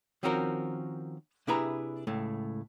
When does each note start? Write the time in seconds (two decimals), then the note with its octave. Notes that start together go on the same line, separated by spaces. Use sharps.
0.23 D#3 F3 C4 C#4 F#4 A#4
1.47 C3 D4 E4 G#4 B4 A#5
2.07 C#2 A2 A3